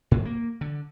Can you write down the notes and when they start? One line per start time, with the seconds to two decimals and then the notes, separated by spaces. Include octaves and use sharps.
0.11 G#2
0.25 A#3
0.61 D3